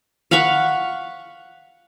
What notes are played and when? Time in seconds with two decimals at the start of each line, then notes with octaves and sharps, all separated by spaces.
0.31 F5 F#5 B5 C#6